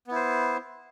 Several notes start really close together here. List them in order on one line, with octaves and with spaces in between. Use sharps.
B3 E4 C5